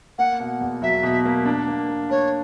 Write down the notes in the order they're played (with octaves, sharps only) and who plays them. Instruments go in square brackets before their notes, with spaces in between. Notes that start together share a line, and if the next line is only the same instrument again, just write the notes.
[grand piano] A#3 [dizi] F#5
[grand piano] B2
E2
[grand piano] F#3 [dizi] E5
[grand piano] B2
A#3
D4
A#3
A#3
[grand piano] D4 [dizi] C#5